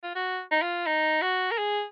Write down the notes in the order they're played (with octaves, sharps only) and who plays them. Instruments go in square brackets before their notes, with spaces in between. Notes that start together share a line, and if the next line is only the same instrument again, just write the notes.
[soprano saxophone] F4
F#4
D#4
F4
D#4
F#4
A#4
G#4